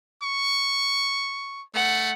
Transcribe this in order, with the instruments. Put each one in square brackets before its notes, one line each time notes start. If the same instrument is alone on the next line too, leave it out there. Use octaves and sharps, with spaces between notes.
[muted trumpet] C#6
[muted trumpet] A3 [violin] F#5